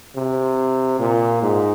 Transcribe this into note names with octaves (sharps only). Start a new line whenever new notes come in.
C3
A#2
G#2